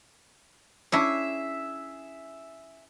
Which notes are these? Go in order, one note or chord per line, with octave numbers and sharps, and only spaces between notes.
C#4 D4 E4 G#4 E5